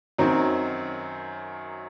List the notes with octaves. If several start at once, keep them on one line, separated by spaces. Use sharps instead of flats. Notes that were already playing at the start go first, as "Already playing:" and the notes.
F#2 D#3 F#3 C4